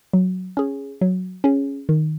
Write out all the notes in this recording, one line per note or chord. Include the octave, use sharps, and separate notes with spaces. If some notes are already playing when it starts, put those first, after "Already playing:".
F#3
C#4 G#4
F#3
C#4 G#4
D#3